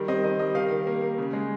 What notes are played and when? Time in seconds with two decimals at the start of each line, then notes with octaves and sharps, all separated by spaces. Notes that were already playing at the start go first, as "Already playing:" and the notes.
Already playing: D#3 G3
0.08 C4 D#5
0.24 D#3 D#5
0.39 G3 D#5
0.55 D#3 F5
0.71 D#3
0.87 A#3
1.02 A#3
1.18 C#3
1.33 G#3